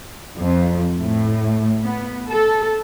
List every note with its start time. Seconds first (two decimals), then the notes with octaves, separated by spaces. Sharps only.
0.39 F2
1.01 A2
1.84 B3
2.32 A4